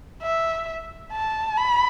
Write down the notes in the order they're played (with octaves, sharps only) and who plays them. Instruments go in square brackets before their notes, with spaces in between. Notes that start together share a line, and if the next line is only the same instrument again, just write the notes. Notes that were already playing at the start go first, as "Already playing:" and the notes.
[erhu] E5
A5
B5